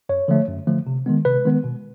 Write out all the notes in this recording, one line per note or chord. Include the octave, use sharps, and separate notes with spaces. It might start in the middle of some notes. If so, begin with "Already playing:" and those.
F#2 C#5
D3 F3 A3
F#2
D3 F3 A3
C3
D#3 G#3 B3
C3 B4
D#3 G#3 B3
B2